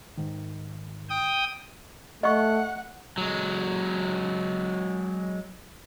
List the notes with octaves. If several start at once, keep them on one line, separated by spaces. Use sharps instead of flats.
G#2 D#3
G5 D#6
A3 D#5 F#5 C#6
F#3 G#3